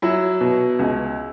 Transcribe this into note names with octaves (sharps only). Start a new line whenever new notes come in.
F#3 E4
B2
C#2